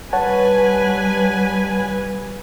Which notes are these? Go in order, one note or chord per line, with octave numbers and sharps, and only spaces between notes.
G3 B4 C#5 F#5 G#5 A5